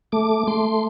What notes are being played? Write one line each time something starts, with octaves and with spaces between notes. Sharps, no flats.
A3 D6
A3 C6